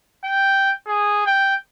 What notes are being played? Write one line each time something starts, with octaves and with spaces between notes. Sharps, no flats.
G5
G#4
G5